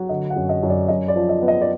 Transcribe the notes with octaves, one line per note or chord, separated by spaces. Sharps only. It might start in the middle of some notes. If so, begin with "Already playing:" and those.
Already playing: F#3
D3 D#5
F#5
F#2
D#5
F#2
D5
F#2 D#5
D5
F3
D#5
B3
D#5
D5